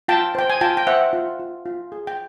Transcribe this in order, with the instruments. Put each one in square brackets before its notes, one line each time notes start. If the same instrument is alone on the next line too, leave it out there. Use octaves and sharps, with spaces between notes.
[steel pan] F4 G5 A5
C5 G5
G#5
F4 G5 A5
G5
C5 E5 F#5
F4
F4
F4
G#4
G5